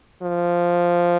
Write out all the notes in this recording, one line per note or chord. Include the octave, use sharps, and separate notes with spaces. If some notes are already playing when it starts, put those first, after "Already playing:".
F3